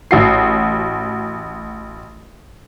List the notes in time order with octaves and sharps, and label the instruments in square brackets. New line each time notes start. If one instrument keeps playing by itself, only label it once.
[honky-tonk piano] A1 F#4 C7